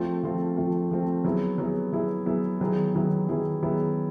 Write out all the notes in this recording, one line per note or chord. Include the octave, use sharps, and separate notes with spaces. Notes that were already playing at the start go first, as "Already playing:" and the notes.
Already playing: F3 A3 C4 F4
F3 A3 C4 F4
F3 A3 C4 F4
F3 A3 C4 F4
F#3 B3 E4 G#4
F#3 B3 E4 G#4
F#3 B3 E4 G#4
F#3 B3 E4 G#4
D#3 F#3 B3 E4 G#4
D#3 F#3 B3 E4 G#4
D#3 F#3 B3 E4 G#4
D#3 F#3 B3 E4 G#4